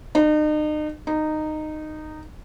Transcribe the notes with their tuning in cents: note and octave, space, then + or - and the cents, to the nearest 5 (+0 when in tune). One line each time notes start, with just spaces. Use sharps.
D#4 -40
D#4 -15